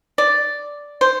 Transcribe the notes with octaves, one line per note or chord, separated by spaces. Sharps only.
D5
C5